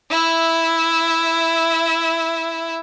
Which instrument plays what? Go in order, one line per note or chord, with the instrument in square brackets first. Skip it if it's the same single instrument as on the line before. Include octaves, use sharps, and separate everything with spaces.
[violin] E4 E5